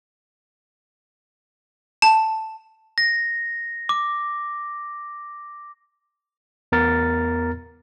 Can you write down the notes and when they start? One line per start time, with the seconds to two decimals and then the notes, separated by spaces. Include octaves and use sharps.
2.02 A5
2.98 A#6
3.89 D6
6.72 E2 B3 A#4 A#5 F6 A6